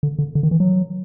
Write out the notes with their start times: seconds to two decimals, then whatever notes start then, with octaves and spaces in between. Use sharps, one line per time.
0.03 D3
0.19 D3
0.35 D3
0.43 D#3
0.51 E3
0.60 F#3